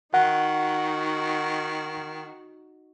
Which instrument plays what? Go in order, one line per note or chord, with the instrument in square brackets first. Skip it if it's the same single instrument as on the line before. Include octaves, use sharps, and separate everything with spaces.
[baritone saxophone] D#3 [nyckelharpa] D#4 F#4 [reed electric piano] F#5